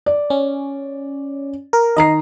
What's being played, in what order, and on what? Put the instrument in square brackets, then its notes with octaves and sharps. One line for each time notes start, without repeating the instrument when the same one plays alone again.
[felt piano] D5
[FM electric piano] C#4
A#4
[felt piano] D#3 A#5 C7 [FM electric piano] D#5